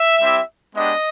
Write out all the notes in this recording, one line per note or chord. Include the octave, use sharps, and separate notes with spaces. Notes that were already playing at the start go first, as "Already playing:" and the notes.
Already playing: E5
G3 C4 E4 G4
G#3 B3 D4 G4 D#5